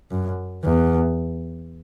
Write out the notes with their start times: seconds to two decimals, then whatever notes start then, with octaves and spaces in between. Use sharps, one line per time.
0.11 F#2
0.64 E2